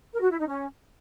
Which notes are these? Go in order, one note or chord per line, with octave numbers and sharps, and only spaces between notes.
A#4
F#4
E4
D#4
C#4